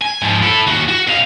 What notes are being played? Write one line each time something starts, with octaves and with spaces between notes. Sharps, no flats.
G#5
G#2 F3
E4 A4
D#2 F#4
F#4
B2 F5